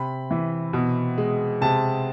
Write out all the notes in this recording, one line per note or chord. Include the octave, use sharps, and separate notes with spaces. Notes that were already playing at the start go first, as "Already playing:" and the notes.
Already playing: C3 B5
E3
B2
G#3
C3 A5